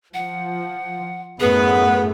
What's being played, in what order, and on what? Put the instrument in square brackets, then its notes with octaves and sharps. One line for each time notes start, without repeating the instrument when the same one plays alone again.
[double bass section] F3 [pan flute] F#5
[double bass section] F#2 A2 A3 [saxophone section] B3 [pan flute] G#4